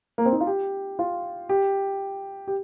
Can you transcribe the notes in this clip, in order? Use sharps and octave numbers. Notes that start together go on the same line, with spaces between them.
A#3
C4
D#4
F4
G4
F4
G4
G4